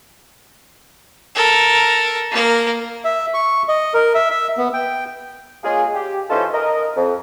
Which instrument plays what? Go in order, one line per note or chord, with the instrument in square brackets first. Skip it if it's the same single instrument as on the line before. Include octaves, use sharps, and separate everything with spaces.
[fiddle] A4 A#4
A#3 A#4
[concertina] E5
C#6
D#5
A#4
E5
E5
B3
G5
[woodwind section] G#3 A#3 C#4 F4 G#4
G4
E3 C#4 D#4 F4 A4 C5
A#4 D#5
F2